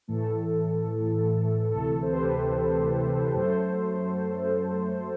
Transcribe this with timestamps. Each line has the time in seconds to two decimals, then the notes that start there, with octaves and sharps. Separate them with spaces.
0.08 A2 E3 A3 A4
1.71 D2 C3 E3 A3 A4
2.02 C5
2.12 G4 B4
3.35 F#2 F#3 A3 A4 C5